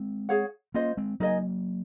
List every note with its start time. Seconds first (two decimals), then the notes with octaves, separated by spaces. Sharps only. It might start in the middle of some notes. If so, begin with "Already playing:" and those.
Already playing: G#3 C4
0.29 G#4 C#5 F#5
0.74 A#3 C#4 F4 C5 D#5
0.97 G#3 C4
1.20 F#3 A#3 D#4 A#4 D#5 G#5